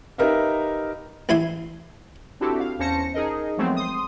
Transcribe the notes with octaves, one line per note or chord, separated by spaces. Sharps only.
D#4 G4 A#4 B4 E5 F5
A1 E4 G#5 C6
C4 D4 E4 F#4 G4 A4
F5
E2 C#4 C5 A5 A#6 C#7
D#4 G#4 A#4 D#5
F3 F#3 G#3 A3 B3 C4
C6 D#6